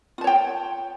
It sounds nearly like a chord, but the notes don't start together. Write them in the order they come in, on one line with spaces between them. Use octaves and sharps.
F4 A5 C#5 G5